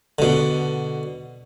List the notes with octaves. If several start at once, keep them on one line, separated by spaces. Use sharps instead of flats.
B2 D3